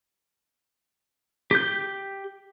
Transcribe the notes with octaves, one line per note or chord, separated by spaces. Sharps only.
G4 G6